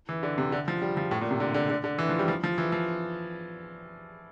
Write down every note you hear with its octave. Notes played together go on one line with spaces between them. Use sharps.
E3
D3
C3
D3
F3
G3
F3
A2
A#2
C3
D3
D3
D3
D3
E3
F3
G3
F3
F3
E3
F3